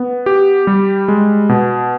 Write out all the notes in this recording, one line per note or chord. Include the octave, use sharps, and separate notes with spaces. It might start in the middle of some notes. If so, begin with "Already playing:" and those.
Already playing: B3
G4
G3
G#3
B2